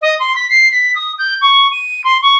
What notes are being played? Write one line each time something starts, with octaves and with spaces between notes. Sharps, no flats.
D#5
C6
B6
C7
B6
D#6
G6
C#6
D#7
C6
C#6